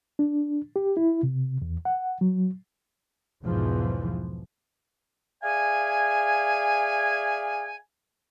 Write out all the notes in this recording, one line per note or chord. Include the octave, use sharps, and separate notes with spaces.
D4
G4
E4
C3
E2
F#5
F#3
B1 E2 G#2 E3 F3
G#4 D5 E5 F5 G#5